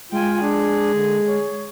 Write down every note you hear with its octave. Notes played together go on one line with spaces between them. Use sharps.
G#3 F4 G5 G#5
D4 G#4
D3
C#5